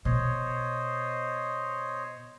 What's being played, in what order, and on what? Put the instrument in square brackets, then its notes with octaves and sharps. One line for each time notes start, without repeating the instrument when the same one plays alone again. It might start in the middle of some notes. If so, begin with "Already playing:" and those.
[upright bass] B2 [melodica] C5 C#5 D#5